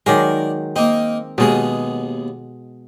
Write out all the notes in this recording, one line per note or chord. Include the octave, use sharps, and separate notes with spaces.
D#3 F#3 G#3 A#4 D5
A#3 C4 D#4
D#2 B2 G#3 B3 G#4